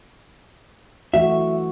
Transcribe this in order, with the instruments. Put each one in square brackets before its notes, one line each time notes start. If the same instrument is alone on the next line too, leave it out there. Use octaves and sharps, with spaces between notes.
[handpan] E3 A3 F#4 [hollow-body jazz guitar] E5